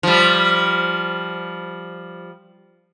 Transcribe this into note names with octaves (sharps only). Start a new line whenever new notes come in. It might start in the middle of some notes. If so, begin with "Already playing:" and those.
F3 G3